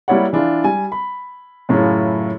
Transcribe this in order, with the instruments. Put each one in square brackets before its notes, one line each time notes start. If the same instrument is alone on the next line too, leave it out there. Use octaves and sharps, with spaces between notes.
[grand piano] G3 A#3 E4 C#5 D5 F#5
E3 D4 E4 F4
G3 G#5
B5
F#2 A2 C#3 C#4 E4 F4